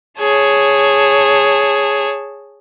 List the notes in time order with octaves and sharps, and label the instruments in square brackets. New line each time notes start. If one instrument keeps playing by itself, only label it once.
[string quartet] G#4 C#5 A5